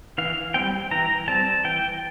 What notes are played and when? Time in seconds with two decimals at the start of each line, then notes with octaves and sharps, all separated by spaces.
0.18 E3 F5
0.54 G3 C4 G5
0.91 E3 A#5
1.28 G3 C4 A5
1.64 E3 G5